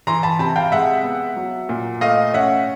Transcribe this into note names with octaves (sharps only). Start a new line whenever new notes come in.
E3 A#5 C6
A5 B5
C3 A5 B5
F5 G5
G#3 E5 F#5
B3
F#3
A#2
A3 D#5 F5
C#4 E5 F#5